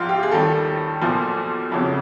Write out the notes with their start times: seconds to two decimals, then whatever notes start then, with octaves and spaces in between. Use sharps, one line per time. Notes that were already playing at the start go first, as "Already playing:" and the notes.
Already playing: A#1 G#2 F3 F4
0.09 G4
0.23 G#4
0.31 D#2 D#3 G3 A4
1.02 B1 A#2 F3
1.71 G1 F2 C#3 F#3